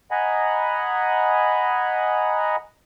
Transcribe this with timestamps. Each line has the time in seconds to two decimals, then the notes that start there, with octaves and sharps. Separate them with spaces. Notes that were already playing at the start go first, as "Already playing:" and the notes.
0.11 D#5 F#5 G#5 A#5 B5